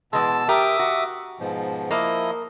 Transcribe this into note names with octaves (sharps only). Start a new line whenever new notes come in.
B2 E3 G#3 A5 E6
G4 A#4 E5 D6 D#6
F#4
G#2 B2 F3
F3 A#3 E4 D#5